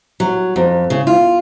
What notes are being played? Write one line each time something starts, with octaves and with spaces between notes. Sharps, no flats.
F#3
F2
C#3
F4